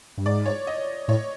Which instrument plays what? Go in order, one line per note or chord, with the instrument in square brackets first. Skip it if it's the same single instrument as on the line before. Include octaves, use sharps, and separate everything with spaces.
[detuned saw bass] G2
[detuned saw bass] G#2 [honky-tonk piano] D5
[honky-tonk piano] C#5
D#5
[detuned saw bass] A2 [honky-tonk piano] C#5